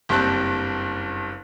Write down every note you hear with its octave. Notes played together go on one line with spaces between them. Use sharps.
F#1 G2 G3 C4 A5 F#6